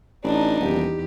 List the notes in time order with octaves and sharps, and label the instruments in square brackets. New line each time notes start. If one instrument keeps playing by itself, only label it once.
[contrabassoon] A1 [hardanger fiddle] D4 D#4
[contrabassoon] D#1 [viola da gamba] E2 G4